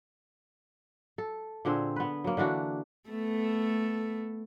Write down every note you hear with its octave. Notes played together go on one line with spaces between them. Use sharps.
A4
A#2 D3 C4 G#4
B3 B4
F#3 A#3
D3 E3 D4 F#4
A3 B3 A4